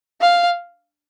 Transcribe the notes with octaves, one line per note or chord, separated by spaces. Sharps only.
F5